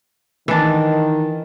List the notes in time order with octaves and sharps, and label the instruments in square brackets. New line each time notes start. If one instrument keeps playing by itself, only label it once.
[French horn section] D#3 [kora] E3 D4